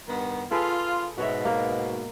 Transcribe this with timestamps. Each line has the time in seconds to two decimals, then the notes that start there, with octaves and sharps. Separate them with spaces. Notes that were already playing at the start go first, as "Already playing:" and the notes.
0.08 G2 D#3 B3
0.51 F4 G#4 A4 B4
1.18 G#2 B2 F#4 C#5 E5
1.45 A#3